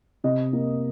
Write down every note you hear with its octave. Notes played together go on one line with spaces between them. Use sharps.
C3 D#5
A#3